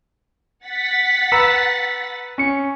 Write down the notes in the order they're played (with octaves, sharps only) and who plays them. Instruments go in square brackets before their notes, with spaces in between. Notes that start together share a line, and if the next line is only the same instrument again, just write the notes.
[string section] F#5 A6 B6
[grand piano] B4 A#5 E6
C#4 C#7